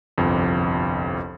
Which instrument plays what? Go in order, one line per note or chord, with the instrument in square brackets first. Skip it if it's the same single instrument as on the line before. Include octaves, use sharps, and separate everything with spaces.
[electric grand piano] G1 C2 F2